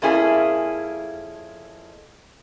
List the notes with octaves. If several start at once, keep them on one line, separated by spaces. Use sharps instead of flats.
F2 A#3 C#4 E4 G#4 G#5